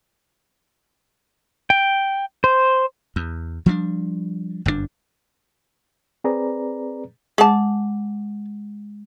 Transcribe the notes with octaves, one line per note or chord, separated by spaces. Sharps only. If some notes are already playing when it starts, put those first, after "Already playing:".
G5
C5
E2
F3 G3 B3 D4
G1 F#2 B2 D4
C4 G#4 B4 D5 A#5
G#3 G#4 F#5 A5 D6